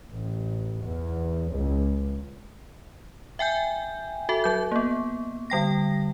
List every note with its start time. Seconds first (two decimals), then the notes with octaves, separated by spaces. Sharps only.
0.11 A1
0.83 E2
1.52 C#2
3.39 E5 G5 G#5 G6
4.29 F#4 A4 E5
4.44 F#3 G6
4.72 A#3 B3
5.50 D3 G3 G5 A#6